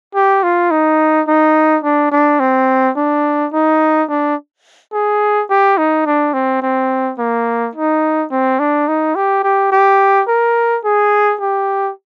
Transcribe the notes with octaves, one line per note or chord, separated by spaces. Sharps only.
G4
F4
D#4
D#4
D4
D4
C4
D4
D#4
D4
G#4
G4
D#4
D4
C4
C4
A#3
D#4
C4
D4
D#4
G4
G4
G4
A#4
G#4
G4